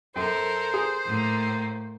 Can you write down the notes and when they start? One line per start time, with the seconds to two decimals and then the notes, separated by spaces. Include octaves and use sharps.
0.16 F#2 A4 A#4 C5
0.74 G#4
1.07 A2 A#3